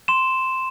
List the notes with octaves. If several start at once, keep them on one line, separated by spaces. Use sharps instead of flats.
C6 E7